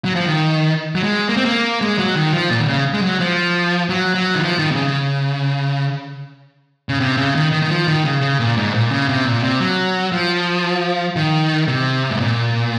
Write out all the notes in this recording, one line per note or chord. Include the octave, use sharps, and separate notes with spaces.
F#3
F3
D#3
F#3
G#3
A#3
C4
A#3
G#3
F#3
D#3
F3
A#2
D#3
C#3
G#3
F#3
F3
F#3
F#3
D#3
F3
D#3
C3
C#3
C#3
C3
C#3
D#3
D#3
D#3
F3
D#3
C#3
C#3
A#2
G#2
A#2
C#3
C3
A#2
C3
F#3
F3
D#3
C3
G#2
A#2